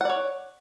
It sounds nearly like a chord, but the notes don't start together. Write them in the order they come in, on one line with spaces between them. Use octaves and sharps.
F#5 D5 C#5